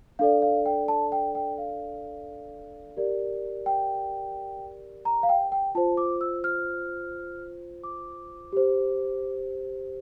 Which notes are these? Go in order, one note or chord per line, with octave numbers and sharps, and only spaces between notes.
D4 A4 D5 F5
F5
G5
A5
G5
G5
F5
G4 A#4 D5
G5
A#5
F5
G5
G5
F4 C5 A5
D6
E6
F6
D6
G4 C5